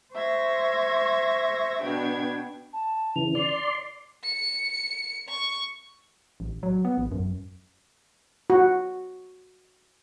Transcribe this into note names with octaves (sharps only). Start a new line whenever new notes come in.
C5 E5 C#6 G#6 A#6
B2 B3 D4 G5 G#6
A5
C#3 E3 F7
D5 C6
C#7
C#6
A1
F#3
B3
A1
F#2
F#4